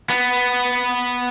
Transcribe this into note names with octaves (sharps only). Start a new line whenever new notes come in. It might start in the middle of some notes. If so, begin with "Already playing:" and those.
B3